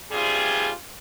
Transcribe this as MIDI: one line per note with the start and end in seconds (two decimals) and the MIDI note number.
0.12 0.70 43
0.12 0.70 48
0.12 0.70 55
0.12 0.70 65
0.12 0.70 68